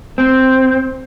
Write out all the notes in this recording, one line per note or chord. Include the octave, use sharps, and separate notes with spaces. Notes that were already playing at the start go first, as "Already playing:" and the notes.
C4